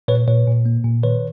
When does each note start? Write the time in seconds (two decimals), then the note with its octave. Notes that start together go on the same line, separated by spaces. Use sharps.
0.08 A#2 B4 C#5
0.28 A#2 B4 C#5
0.47 A#2
0.66 A#3
0.84 A#2
1.03 D#3 B4 C#5